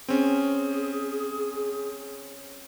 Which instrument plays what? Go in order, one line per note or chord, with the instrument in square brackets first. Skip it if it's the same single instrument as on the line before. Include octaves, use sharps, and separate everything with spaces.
[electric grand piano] C4 C#4 [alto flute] G#4